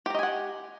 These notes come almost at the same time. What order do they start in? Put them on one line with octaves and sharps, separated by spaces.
G4 A#5 D#5 G#5 F#5